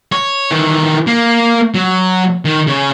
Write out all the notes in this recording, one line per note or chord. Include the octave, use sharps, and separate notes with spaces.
C#5
D#3 E3
A#3
F#3
D#3
C#3 C#5